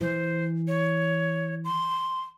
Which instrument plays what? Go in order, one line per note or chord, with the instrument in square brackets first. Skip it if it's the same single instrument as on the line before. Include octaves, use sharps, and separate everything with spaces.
[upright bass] E3 [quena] C5
[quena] C#5
C6